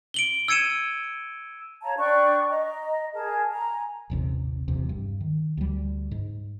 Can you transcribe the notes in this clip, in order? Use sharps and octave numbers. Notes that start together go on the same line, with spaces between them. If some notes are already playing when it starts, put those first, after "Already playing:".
D7 F#7 G7
E6 G#6 C#7 D#7 E7
C#5 F5 A5 A#5
D4 G5 C#6 F#6
D#5 A#5
G#4 A#4 A5
G#5 A#5
D#1 A1 C3
E1 E2 C3
G2
D#3
D2 G3
G#2